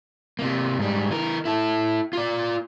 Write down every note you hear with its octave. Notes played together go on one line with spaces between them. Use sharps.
C3 A#3
G#2 G3
E3 A#4
E4 A4
F4 D5